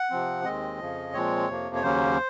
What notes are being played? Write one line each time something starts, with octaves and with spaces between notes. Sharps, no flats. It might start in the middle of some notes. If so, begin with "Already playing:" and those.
Already playing: F#5
C3 F3 C4
D#2 D#3 G#3 C4 D#5
F2 C#3 F3
A#2 F3 G#3 C4 C#5
F2 C3 F3 A#3
C#5
D#2 C#3 F#3 A#3 C#4 C5